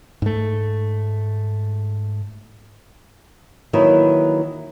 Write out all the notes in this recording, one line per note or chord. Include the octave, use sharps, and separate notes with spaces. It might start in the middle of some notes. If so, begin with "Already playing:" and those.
G#2 A3
D#3 E3 F#3 A#3 E4